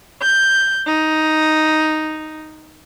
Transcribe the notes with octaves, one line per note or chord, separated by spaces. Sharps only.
G6
D#4